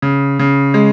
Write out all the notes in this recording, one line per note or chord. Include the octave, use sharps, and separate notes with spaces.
C#3
C#3
G#3